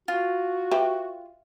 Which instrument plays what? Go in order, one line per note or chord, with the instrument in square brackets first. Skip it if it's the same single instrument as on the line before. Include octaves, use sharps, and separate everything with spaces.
[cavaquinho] F4 [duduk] F#4
[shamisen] G4 B4 [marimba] E5 G5